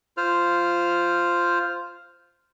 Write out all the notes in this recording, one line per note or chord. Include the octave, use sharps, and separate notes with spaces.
F4 C5 F6